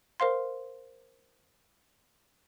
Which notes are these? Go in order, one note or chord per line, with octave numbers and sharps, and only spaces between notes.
A#4 C5 F5 C6